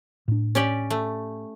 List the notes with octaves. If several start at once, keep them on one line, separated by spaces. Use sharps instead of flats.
A2 D4
C#4 G4 D5
A3